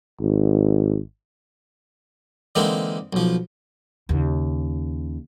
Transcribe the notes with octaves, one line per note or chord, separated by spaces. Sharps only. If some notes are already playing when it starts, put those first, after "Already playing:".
G#1
D3 E3 G#3 A#3 C4 D#4
B1 F3
D#2 C#3